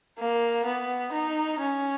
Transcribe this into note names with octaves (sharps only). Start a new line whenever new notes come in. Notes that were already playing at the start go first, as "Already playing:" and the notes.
A#3
B3
D#4
C#4